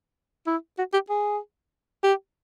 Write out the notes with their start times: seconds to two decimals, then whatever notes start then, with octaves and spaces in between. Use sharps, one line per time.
0.47 E4
0.78 F#4
0.93 G4
1.09 G#4
2.04 G4